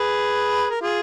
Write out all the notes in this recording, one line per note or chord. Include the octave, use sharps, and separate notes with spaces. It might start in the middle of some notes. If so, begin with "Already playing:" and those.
Already playing: G#4 B4
A#4
F4 G#4